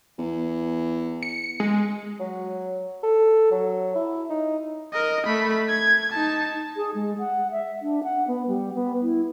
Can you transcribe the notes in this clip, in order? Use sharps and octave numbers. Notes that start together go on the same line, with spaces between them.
E2
C#7
G#3
F#3
A4
F#3
E4
D#4
A#4 D#5
A3 B5
G#6
D#4 A5
G#4
G#3
F#5
E5
D4
F#5
B3
G3
B3
E4